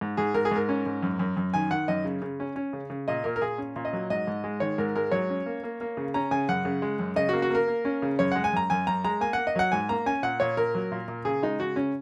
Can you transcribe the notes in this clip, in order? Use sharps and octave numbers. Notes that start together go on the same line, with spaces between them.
G#2
G#2 G#4
G#2 A#4
G#4
G#2 A#4
C#4
G#2
F#2
F#2
F#2
D#3 G#5
D#3 F#5
F#2 D#5
C#3
C#3
C#4
C#4
C#3
C#3
A#2 D#5
A#2 A#4
A#4
A#2 G#4
C#4
A#2
D#5
F#3
G#2 D#5
G#2
G#3
D#3 C#5
G#2 A#4
G#3 A#4
F#3 C#5
C#4
A#3
A#3
A#3
C#3
C#4 A#5
C#3 G#5
F#2 F#5
C#3
G#3
F#2
C#3 D#5
A#3 F#4
F#4
A#3 A#4
A#3
C#4
C#3
F#2 C#5
G#3 F#5
G#5
F#2 A#5
F#2 G#5
F#2 A#5
G#3 A#5
A#3 G#5
A#3 F#5
D#5
F#3 F#5
G#2 G#5
A#3 A#5
C#4 G#5
A#2 F#5
A#2 C#5
A#2 A#4
F#3
A#2
A#2
C#3 G#4
G#3 D#4
C#3 F#4
C#3 C#4